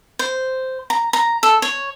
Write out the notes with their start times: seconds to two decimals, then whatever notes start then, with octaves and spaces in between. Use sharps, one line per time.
0.19 C5
0.90 A#5
1.13 A#5
1.43 A4
1.62 C#5